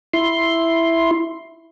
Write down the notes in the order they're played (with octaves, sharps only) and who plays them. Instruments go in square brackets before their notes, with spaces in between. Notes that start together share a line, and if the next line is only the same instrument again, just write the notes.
[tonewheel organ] E4 C6